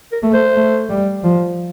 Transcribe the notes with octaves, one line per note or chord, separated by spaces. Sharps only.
A#4
A3
C5
A3
G3
F3